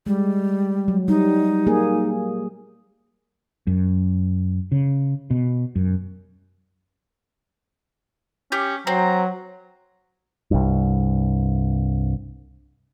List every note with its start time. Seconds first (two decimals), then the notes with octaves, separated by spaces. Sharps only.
0.06 G3 G#3
0.88 F#3
1.08 G3 D#4
1.67 A#3 G#4
3.67 F#2
4.72 C#3
5.31 B2
5.76 F#2
8.52 C#4 G4 G6
8.87 F#3 C4 C5 A#5
10.51 C2 G2